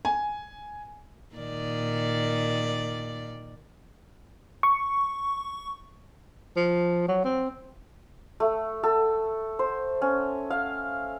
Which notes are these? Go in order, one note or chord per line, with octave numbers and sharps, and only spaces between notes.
G#5
A#2 D#3 D5
C#6
F3
F#3
C4
A3
A4
C5
C#4
F5